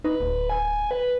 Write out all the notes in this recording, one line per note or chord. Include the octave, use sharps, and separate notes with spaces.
D#4 B4
D1
G#5
G#5
B4